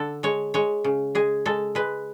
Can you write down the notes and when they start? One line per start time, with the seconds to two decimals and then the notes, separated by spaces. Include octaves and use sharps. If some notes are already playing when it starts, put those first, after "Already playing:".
Already playing: D3 A4
0.23 G#3 C#5
0.54 G#3 C#5
0.84 C#3
1.15 G#3 G#4
1.46 G#3 A4
1.75 G#3 B4